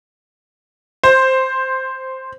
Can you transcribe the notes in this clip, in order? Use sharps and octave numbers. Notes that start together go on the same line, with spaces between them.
C5